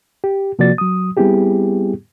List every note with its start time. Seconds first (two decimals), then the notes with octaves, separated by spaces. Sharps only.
0.24 G4
0.59 C3 F3 A#3 F#4 D5 A6
0.78 F#3 D#6
1.17 G3 B3 C4 E4 G4 G#4